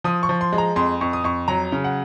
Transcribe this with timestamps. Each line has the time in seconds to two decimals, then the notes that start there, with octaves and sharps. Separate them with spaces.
0.04 F3 D#6
0.23 C#6
0.29 F3
0.41 C6
0.53 G#3
0.58 A#5
0.76 F2 C6
1.01 F2 C#6
1.13 D#6
1.24 F2 C#6
1.48 F#3 A#5
1.72 C#3
1.84 F#5